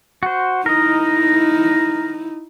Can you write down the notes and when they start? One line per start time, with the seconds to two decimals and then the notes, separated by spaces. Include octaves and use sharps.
0.23 F#4 C5
0.66 D#4 E4 A#4 D#5